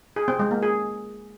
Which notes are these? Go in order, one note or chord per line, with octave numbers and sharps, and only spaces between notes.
G#4
C4
G#3
A#3
G#4